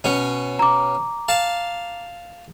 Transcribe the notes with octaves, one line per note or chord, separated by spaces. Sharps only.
B2 C#4
A#5 D6
F5 A5